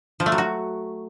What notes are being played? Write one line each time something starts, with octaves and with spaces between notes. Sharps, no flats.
F3
A3
F#3
F#4